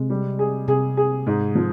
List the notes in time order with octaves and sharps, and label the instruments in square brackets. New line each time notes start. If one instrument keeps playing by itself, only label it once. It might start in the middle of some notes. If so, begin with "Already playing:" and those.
Already playing: [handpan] C3 [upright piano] G#3
[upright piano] G3
G#4
[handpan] C3 [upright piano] G#4
[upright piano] G#4
G#2
F3